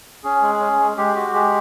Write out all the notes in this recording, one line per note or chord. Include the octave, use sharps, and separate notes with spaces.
C#4 G#4
G#3
C#4
G#3
G#3 G4
F#4
G#3 G4